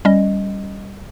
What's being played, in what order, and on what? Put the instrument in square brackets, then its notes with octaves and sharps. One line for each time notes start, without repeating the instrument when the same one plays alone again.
[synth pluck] G3 C#4 D#5